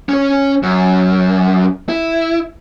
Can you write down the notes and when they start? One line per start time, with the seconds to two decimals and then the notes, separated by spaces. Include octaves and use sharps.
0.09 C#4 C#5
0.63 F#2
1.89 E4